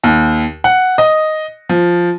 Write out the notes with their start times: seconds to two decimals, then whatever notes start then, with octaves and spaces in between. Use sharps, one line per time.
0.04 D#2
0.64 F#5
0.98 D#5
1.69 F3